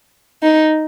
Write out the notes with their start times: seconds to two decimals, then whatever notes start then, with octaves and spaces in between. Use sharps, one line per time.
0.43 D#4